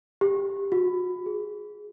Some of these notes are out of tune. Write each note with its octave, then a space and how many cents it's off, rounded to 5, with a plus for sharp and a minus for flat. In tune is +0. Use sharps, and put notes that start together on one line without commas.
G4 +10
F#4 -35
G#4 +5